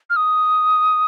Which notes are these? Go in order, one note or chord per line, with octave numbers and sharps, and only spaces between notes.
F6
D#6